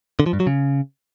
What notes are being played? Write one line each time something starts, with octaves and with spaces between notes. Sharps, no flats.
D3
F3
G2
F#3
C#3